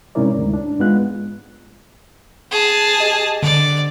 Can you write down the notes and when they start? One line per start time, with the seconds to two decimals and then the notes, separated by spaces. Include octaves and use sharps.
0.15 G#2 C3 C#4 E4 A#4 D5
0.37 D2 G#2
0.54 D4
0.80 G#2 G#3 B3 F4 F#6
2.51 G#4 A5
2.98 G4 D#5
3.43 D3 D5